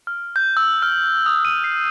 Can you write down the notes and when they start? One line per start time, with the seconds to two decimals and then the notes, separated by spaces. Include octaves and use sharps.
0.07 F6
0.36 G6
0.57 E6
0.82 F6
1.26 D#6
1.45 D#7
1.64 C7